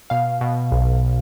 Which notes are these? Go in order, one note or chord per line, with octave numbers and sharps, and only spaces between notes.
B2 F5
B2
B1